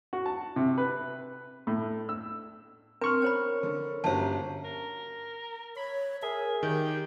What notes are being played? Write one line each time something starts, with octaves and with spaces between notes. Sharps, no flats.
F#4
A5
C3
B4
A2
E6
C4 D4 A#4 C6 C#6 F6
C#4 C5 C#5 B5
D3
G1 A#3 C#4 F#4 G4 C5 A5
A#4
C#5 B5
G#4 A#4 E5
D#3 G4 G5